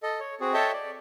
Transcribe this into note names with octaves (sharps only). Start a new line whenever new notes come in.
A4 D#5
C#5
C4 F#4 G#4
A4 C#5 D#5 E5 G5 A5
D5